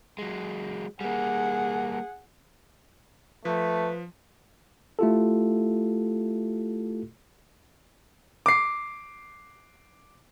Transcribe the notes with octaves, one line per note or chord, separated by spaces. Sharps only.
F#3 G#3
G3 A#3 G#4 F#5
F3 A3 B4
A3 E4 F4 G4 A4
D6 C7